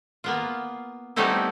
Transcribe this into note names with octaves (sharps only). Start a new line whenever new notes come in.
A#3 B3 F4
G3 A3 B3 C4 D#4 E4